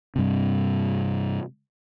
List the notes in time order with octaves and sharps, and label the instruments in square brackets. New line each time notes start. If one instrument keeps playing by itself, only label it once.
[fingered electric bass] G2 C3